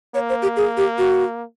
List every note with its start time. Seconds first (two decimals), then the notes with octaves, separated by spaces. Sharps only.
0.14 A#3 C#5
0.29 C5
0.42 G4
0.56 G#4
0.77 G4
0.98 F#4